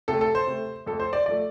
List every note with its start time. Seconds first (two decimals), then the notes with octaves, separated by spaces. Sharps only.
0.08 C3 A3 A4
0.21 A4
0.35 C5
0.47 C3 A3
0.86 F2 F3 A3 A4
1.00 C5
1.13 D5
1.26 F3 A3 D5